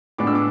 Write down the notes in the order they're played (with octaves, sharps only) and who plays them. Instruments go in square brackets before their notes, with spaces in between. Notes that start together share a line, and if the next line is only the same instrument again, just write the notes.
[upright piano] A2 G#3 B3 D4 D6
E6
D6